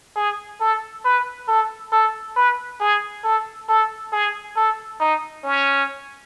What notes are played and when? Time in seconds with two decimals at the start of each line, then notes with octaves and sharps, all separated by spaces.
0.16 G#4
0.61 A4
1.05 B4
1.48 A4
1.93 A4
2.36 B4
2.81 G#4
3.24 A4
3.69 A4
4.13 G#4
4.56 A4
5.01 D#4
5.44 C#4